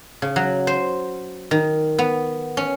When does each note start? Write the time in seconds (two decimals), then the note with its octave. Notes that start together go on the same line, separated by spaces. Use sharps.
0.22 C#3
0.36 F#3
0.67 C5
1.51 D#3
1.98 B3
2.57 C#4